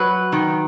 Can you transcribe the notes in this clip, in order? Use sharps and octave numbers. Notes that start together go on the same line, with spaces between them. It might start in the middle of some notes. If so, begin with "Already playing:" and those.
Already playing: F#3 B4
D#3